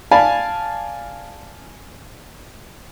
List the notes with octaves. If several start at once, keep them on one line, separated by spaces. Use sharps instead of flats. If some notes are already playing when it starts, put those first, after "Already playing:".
D5 F5 G#5 A5 B5